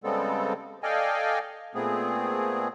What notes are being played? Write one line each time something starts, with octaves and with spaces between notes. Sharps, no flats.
C#3 G3 G#3 B3 C4 A4
A4 D5 D#5 F5 G5 G#5
A#2 A3 B3 C4 G#4